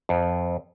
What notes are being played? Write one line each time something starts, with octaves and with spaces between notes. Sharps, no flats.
F2